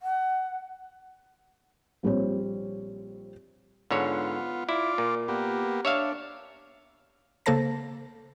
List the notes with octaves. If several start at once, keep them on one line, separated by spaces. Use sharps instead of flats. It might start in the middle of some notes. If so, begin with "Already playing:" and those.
F#5
A#1 G3 C4 C#5
G#2 D3 B3 F4 C#5
E4 F4 D5 D6
A#2
A#3 B3 G4
D4 C#5 E5 F5
C#3 A#3 A4 C5 A5 A#6